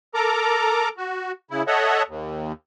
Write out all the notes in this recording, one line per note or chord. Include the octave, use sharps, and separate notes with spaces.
A4 A#4 A#5 D6
F#4
C#3 E4
A4 C#5 D#5 E5 F#5
D#2